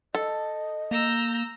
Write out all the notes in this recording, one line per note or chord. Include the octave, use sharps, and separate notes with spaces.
A4 D#5
A#3 A#5 E6 G6